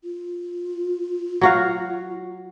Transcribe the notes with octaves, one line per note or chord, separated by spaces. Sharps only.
F4
F#3 F#4 F5